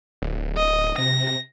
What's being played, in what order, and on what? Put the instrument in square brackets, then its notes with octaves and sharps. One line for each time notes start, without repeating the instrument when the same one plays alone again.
[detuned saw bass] D1
[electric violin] D#5
[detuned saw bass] C3 [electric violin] A#6